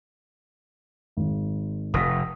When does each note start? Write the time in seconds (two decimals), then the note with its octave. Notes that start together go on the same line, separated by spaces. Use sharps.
1.17 G#1
1.94 F1 D#6 A#6 B6